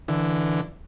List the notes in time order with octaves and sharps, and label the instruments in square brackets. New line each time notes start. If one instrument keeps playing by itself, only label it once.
[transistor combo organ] D3 E3